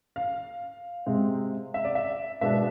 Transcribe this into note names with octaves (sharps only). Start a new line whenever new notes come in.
F5
C3 G#3 C4
E5
D5
E5
B2 G#3 B3 D4 E5